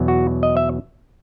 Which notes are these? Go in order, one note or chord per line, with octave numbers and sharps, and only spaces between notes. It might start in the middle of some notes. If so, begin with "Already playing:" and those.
Already playing: E2 B2 F#3
F#4
D#5
E5